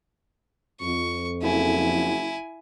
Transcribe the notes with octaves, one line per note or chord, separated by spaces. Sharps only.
F2 C#6
F#1 E4 G#5